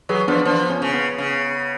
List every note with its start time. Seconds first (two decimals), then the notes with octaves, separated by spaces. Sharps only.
0.09 F#3 G#4 B4
0.28 F3 B3 D4
0.45 F3 B3 D4
0.70 C#4
0.82 C#3
0.94 B3
1.18 C#3